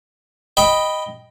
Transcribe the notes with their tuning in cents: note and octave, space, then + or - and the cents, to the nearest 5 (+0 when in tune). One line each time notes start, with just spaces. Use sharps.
D#5 +0 G5 +0 B5 +0